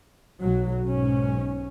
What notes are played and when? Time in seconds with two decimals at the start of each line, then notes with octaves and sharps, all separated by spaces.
0.41 B1 F#3
0.89 B1 G#2 C#4